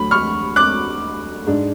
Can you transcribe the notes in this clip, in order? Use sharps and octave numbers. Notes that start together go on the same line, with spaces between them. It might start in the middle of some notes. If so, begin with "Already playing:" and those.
Already playing: D2 D3 F#3 B5
C#6 F6
D6 F#6
G#2 G#3 D4